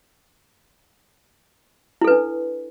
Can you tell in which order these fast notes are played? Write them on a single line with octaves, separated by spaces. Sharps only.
E4 A4 B4 D4